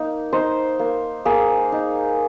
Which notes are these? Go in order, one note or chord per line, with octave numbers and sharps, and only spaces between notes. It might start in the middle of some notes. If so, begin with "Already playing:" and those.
Already playing: A#3 D#4
D#4 C5
A#3
A#3 G#4
D#4